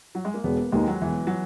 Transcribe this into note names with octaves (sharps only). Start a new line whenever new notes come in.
F#3
G#3
A#3
E1 B3
A#3
D#2 D#3 G#3
F#3
E1 E3
F#3